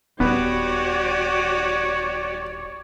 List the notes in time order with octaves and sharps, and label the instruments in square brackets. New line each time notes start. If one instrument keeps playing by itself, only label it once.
[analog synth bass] D#1 [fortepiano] B3 [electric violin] F#4 G4 [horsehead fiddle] C#5 D5